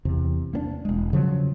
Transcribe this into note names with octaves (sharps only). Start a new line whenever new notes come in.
E2 C3
A#3 B3 D4
E1 G#3
C#3 F3 F#3